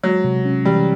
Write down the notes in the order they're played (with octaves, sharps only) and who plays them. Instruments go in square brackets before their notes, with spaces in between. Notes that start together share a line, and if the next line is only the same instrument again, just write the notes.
[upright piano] F#3 [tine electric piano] G#3
[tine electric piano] C3
C#4
[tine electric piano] E3 [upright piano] G3